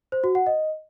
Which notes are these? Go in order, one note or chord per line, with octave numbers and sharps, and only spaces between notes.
C5
F#4
F#5
D#5